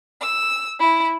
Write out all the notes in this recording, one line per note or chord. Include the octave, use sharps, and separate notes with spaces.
E6
E4